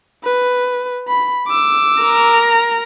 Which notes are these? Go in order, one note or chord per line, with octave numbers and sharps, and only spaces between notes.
B4
B5
D6 E6
A#4 A#5